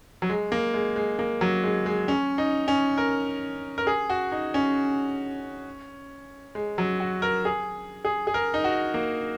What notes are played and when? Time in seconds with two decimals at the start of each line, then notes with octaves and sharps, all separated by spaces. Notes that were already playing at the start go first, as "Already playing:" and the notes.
0.22 F#3
0.30 G#3
0.52 A#3
0.74 G#3
0.96 G#3
1.19 A#3
1.41 F#3
1.64 G#3
1.86 G#3
2.08 C#4
2.38 D#4
2.68 C#4
2.98 A#4
3.78 A#4
3.87 G#4
4.10 F#4
4.32 D#4
4.54 C#4
6.55 G#3
6.78 F#3
7.00 F#4
7.22 A#4
7.45 G#4
8.05 G#4
8.27 G#4
8.34 A#4
8.54 D#4
8.64 F#4
8.94 A#3